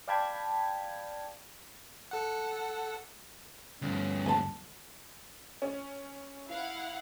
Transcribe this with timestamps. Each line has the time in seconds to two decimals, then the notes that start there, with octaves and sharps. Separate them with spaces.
0.08 D5 F5 G5 A5 B5 G#6
2.11 A4 F#5
3.82 D2 G2 C#4
4.26 D#2 A5
5.62 C#4
6.48 E4 F5 F#5